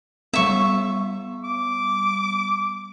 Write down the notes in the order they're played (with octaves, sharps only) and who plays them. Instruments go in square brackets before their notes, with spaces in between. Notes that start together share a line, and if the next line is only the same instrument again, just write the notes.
[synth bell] G3 B3 [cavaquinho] E5 C#6
[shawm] D6